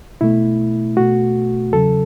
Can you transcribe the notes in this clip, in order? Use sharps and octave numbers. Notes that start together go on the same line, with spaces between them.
B2 A3 E4
B2 A3 F#4
E2 C#3 F#3 A4